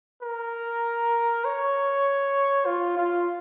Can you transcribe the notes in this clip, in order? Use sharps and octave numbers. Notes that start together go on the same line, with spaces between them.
A#4
C#5
F4
F4